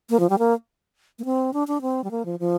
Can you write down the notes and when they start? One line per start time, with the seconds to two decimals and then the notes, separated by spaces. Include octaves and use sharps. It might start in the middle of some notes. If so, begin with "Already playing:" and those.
0.10 A#3
0.20 F3
0.30 G3
0.39 A#3
1.19 A#3
1.25 C4
1.53 D4
1.68 D4
1.82 C4
2.04 G3
2.11 A#3
2.25 F3
2.40 F3